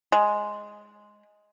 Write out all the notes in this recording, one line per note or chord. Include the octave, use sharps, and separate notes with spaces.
G#3